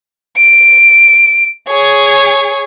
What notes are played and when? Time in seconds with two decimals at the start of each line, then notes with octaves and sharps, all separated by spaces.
0.38 D7
1.69 G#4 C#5